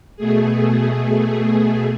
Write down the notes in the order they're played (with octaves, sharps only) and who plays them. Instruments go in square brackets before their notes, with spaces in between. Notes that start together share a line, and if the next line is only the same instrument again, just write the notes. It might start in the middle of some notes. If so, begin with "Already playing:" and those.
[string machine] B2 A3 G#4